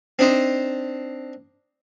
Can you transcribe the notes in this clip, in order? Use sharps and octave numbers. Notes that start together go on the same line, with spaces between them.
C4 D4 D#4 C5